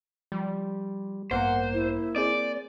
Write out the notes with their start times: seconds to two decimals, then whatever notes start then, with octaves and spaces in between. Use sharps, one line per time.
0.32 F3 G3
1.31 A1 G2 A#3 B3 C5 F#5
1.74 E4
2.16 C4 G#4 C5 D5